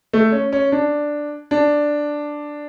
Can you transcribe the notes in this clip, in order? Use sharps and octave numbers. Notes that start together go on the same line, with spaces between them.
A3
C#4
C#4
D4
D4